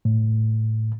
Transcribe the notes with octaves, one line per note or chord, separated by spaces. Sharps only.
A2